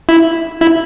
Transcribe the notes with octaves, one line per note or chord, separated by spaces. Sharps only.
E4
E4